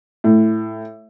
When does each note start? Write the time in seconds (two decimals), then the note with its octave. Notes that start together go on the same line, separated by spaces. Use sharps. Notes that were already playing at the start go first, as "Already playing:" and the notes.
0.24 A2